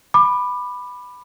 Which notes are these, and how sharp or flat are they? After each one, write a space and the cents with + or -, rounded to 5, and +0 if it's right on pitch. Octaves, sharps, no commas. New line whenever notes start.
B5 +0 D6 +25